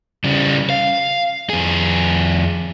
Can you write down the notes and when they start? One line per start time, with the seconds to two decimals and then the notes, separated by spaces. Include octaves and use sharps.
0.24 C#3 G3
0.70 F5
1.49 F2 G#4